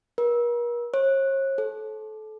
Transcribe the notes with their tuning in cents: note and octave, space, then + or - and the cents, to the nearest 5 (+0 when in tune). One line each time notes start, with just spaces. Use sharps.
A#4 +45
C#5 -45
A4 -25